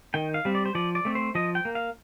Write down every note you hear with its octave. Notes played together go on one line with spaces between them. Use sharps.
D#3 G5
F5
G3 C4
D5
C5
F3 D5
D5
A3 C4
C5
F3 D#5
G5
A#3
F5